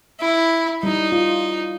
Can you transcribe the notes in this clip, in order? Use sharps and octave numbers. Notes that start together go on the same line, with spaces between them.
E4
G3 D#4 E4
F4